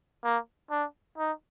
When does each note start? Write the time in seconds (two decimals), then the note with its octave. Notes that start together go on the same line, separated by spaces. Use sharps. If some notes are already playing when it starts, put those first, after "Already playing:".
0.24 A#3
0.70 D4
1.18 D#4